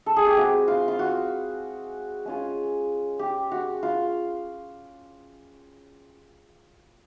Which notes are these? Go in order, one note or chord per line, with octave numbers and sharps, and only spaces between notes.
A4
G#4
G4
G#3 C4 E4 F#4
F4
F4
F#4
G#3 C#4 F4
G4
F#4
F4